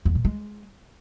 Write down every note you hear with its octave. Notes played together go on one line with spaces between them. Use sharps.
E2
A#2
G#3